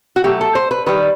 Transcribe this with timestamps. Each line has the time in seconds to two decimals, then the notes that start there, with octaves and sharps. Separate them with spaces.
0.16 F#4
0.24 B2 F#3 A3 G4
0.41 A4
0.55 C5
0.71 B4
0.86 D#3 G3 B4